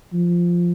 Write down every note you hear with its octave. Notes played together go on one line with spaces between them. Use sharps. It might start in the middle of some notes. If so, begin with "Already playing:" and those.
F3